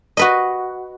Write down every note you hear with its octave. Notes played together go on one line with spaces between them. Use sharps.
F#4 B4 D#5